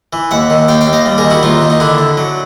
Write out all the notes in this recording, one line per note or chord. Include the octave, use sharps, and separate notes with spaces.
E3
D#2 E5 F#5
D#3
D#2 F5 G5
F5 G5
D#2
D#5 F5
G3
G#4 A#4
D#3
E4 F#4
D#2 D#4 F4
D#3
D#4
D3 D4 E4
D3
F#3